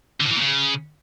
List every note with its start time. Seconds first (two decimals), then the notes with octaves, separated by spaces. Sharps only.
0.20 D3
0.25 A2
0.31 E3
0.36 A#2
0.41 C#3